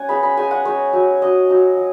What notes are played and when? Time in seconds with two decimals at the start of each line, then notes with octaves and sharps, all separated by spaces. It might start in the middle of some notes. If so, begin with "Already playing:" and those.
Already playing: C#4 F#5 G#5
0.09 G#3 B3 D#4 B5
0.23 B5
0.37 G#3 D#4 G#5
0.51 F#5
0.65 G#3 D#4 C#5
0.93 F#3 D#4
1.21 F#3 D#4 D#5
1.49 F#3 D#4
1.77 F#3